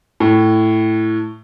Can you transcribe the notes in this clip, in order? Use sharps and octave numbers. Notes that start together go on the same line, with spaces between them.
A2